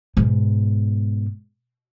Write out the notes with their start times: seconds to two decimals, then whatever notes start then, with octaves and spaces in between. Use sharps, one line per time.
0.17 G#2 B2